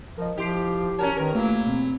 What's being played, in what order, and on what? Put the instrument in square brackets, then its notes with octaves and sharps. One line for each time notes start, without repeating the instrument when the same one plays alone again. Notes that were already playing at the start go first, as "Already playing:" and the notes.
[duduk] F3 [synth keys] A#4 D#5
[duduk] F3 [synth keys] E4 C6 C7 [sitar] G4
[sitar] C#4 F#4 C#5 [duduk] A#4 [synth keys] A5 A#5
[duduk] D#3 [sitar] A#4 [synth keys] B4 C#5
[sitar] F#3 E4 [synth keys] A3 F4 [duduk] A#3
[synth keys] B2 C4